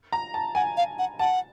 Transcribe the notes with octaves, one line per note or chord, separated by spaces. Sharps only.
A#5
A5
F#5 G#5
F5
F#5
F#5 A5